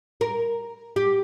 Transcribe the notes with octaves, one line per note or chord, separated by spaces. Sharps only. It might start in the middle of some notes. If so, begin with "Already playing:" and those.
A#4
G4